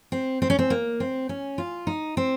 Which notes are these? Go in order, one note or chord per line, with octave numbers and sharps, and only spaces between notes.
C4
C4
C#4
C4
A#3
C4
C#4
F4
D#4
C4